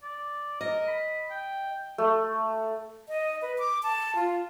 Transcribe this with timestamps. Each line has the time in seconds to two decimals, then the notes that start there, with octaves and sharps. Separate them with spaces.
0.03 D5
0.61 A#4 D#5
0.88 B5
1.31 G5
1.98 A3
3.09 D#5
3.42 B4
3.58 D6
3.83 A5
4.15 F4